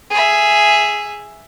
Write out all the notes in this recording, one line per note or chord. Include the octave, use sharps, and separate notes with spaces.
G#4 E5